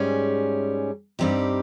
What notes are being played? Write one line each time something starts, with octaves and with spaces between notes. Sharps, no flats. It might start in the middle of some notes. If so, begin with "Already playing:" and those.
Already playing: G#2 G3 C#4 G#4
G2 G3 C4 D#4 G4